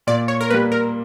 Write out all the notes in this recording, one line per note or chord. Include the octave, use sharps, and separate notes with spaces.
A#2 D5
C#5
A#4
G3 A#3 B4
A#4